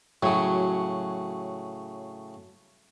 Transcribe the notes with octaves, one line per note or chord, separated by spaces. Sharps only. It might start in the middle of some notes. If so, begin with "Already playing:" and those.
A2 C#3 F#3